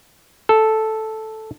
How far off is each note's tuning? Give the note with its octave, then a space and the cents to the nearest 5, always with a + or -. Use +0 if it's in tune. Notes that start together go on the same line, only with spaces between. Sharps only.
A4 -5